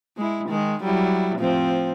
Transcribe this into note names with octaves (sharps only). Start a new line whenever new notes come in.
G#3 E4
D#3 G#3
F#3 G3 E4
A2 F3 C4